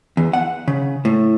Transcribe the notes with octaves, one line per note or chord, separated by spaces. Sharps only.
E2
F#5
C#3
A2